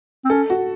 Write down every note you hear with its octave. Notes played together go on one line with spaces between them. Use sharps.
C4
C#4 A4
F#4